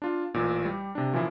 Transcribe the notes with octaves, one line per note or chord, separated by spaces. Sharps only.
D4 F4
A1 A#2
G3 G4
C3 D4
A#2 E3 F3 C#4 E4 F4